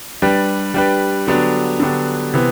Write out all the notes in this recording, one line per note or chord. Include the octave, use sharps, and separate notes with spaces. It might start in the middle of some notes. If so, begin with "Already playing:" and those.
G3 D4 G4 B4
G3 D4 G4 B4
D3 F#3 B3 D4 G4
D3 F#3 B3 D4 G4
C3 E3 B3